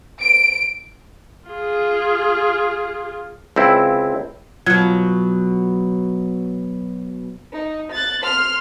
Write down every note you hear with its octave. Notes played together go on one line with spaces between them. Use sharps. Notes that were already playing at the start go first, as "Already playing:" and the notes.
D7
F4 G#4
C#2 C4 E4
B2 F#3 F4 G#6
D#4
F#6 A6
C6 F6